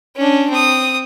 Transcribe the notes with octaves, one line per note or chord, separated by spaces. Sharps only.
C#4 D4
C4 D#6